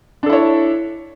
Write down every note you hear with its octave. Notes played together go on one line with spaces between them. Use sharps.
D4 E4 A4 C#5